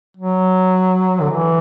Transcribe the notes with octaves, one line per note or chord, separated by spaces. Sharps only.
F#3
D3
E3